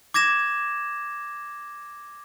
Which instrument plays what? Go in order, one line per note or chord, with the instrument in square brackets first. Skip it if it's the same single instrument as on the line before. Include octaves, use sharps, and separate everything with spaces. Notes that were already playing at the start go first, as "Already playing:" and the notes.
[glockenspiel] D6 G#6 A#6 E7